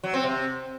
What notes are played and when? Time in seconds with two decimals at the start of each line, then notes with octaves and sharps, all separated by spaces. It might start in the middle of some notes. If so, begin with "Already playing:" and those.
0.04 F#3
0.14 C4
0.24 C3